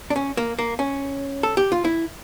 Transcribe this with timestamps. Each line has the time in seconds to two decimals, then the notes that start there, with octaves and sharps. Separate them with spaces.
0.10 D4
0.16 C#4
0.37 A#3
0.59 A#3
0.79 C#4
1.43 A4
1.57 G4
1.72 F4
1.85 E4